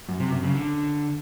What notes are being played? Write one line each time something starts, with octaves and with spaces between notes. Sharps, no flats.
F#2
C3
F#2
C#3
D3